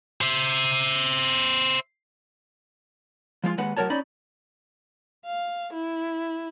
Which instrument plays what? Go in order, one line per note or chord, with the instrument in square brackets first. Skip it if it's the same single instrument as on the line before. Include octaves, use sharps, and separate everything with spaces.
[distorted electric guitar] C5 E5
[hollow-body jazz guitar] F3 G#3 F4
D#2 G#3 B4 F#5
A2 F#3 A#4 C#5 A5
C#4 D#4 D5 B5
[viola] F5
E4